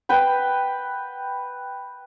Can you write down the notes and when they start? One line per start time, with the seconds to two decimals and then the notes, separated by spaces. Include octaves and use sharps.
0.09 B4 G5 B5